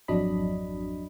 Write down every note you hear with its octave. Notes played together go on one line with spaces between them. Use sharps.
G#1 F2 F#3 D4 D#5 B5